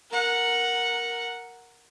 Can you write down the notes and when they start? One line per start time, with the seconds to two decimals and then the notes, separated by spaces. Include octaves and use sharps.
0.11 A#4 F#5